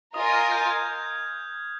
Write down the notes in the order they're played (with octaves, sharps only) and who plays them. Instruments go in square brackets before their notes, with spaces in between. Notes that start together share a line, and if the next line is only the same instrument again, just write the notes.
[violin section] F4 A#4 D#5 G#5 [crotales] D#6
[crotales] F6
G6
G#6